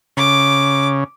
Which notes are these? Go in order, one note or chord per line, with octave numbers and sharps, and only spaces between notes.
C#3 D6